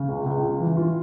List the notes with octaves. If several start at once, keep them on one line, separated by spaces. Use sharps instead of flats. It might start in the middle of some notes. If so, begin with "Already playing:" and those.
Already playing: C#3
C#2
C#2
F4
E3
F4